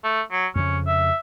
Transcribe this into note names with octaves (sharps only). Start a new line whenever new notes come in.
A3
F#3
F2 C#3 C#4
E5